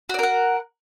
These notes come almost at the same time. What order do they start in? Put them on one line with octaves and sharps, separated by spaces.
F#4 D5 A#4 F#5